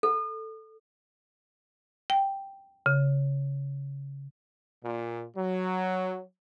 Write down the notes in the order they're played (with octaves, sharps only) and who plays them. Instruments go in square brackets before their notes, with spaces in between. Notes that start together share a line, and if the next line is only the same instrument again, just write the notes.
[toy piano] A4
[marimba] G5
C#3
[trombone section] A#2
F#3